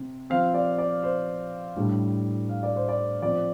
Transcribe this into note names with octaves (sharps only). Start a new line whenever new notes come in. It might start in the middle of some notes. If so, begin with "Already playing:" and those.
Already playing: C3
F3 C4 F5
D5
D5
C5
A2 G3 D4
F5
D5
C5
D5
F3 C4 D5